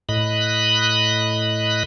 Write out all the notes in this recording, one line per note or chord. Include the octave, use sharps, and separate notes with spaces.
A2 D#5 B5 F#6